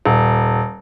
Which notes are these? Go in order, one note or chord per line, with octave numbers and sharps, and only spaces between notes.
D#1